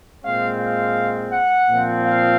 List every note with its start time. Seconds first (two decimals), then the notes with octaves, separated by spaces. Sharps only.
0.23 A#2 G#3 C4 F5
0.60 F5
1.33 F#5
1.69 A#2 F3 C4
2.06 F5